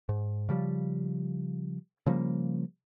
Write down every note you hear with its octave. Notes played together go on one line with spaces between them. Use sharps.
G#2
C#3 F3 G3
C#3 F3 G3 A#3